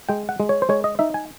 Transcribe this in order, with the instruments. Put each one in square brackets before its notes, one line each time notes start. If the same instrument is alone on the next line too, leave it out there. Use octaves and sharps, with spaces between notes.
[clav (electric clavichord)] G#3 G5
F#5
G#3
C#5
C5
G#3 C#5
D#5
D#4 E5
G#5